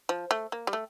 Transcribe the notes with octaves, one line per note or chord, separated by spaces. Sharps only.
F3
A3
A#3
G3
A3